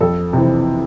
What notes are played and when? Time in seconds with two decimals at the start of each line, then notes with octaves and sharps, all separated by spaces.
0.01 F2 A4
0.33 C3 E3